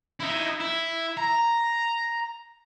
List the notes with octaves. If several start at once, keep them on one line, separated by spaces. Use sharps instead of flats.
D#4 E4
E4
A#5